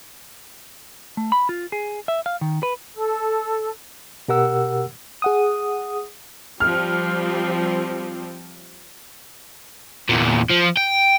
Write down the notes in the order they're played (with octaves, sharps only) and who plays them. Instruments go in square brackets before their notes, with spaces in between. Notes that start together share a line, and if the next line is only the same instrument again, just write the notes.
[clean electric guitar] A3
B5
F4
G#4
E5
F5
D#3
B4
[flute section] A4
[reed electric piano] B2 G4 A#4 F#5 E6
[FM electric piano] G#4 F#5 D#6
[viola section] F3 G3 C4 [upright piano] F6
[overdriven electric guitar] E2 A#2
F3
G5